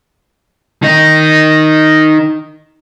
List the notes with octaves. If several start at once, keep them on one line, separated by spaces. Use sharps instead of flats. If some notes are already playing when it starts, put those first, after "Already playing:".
D#3 D#4